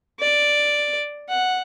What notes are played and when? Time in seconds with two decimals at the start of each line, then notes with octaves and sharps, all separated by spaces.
0.20 D5
1.29 F#5